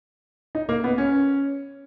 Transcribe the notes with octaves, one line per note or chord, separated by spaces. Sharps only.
D#4
A#3
B3
C#4